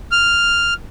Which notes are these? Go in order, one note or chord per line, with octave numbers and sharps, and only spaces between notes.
F6